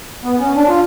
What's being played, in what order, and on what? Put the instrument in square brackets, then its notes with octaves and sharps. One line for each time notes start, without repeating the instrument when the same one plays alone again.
[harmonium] B3
C#4
D4
F4